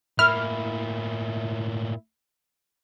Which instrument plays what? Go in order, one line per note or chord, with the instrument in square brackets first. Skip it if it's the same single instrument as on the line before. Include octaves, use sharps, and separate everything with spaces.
[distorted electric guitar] A2 A#3 [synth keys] E4 [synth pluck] F6